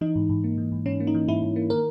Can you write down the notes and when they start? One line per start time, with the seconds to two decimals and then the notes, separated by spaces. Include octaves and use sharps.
0.01 E3 D#4
0.16 G#2
0.29 G#2
0.44 A#3
0.58 E3
0.72 G#2
0.86 G#2 C#4
1.00 A#3
1.07 D#4
1.14 E3
1.28 G#2 E4
1.42 G#2
1.56 A#3
1.70 D#3 A#4